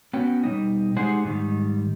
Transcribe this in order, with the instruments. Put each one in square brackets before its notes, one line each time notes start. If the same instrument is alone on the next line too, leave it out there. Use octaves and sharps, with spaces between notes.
[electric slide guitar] B3 C#4 F#4 G5
B2 G3 D#4
G#3 D#4 G4 G#4 C5 F#5
G#2 D#3 G3